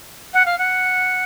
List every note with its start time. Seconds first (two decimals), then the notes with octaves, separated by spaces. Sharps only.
0.34 F#5
0.46 F5
0.58 F#5